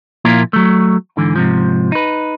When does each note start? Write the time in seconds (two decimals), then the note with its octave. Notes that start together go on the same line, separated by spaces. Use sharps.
0.25 A#2 F3 A#3 E4 F4 A#4
0.53 F#3 A3
1.17 G#2 D3 E3
1.36 G#2 C3 F3
1.92 D#4 B4